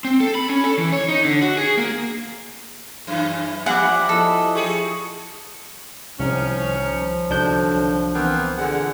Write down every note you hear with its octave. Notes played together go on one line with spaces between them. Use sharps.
C4
A4
B5
C#4
A4
E3
C#5
D#4
D3
F#4
G#4
A#3
F#2 E3
F3 G3 E5 F#5 G#5 D6
F3 E4 A4 D#5
G4 G#4 C#6 C#7
C2 D#3 F3 C#4
F3
C2 D3 D#3 F#3 D4 G6
E3 B3 C4 A#4
A#2 D3 G#4 F#5